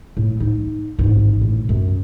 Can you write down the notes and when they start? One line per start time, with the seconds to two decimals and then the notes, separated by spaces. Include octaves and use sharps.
0.17 A2
0.40 D#4
0.99 A1 G#2
1.41 A2
1.69 F#2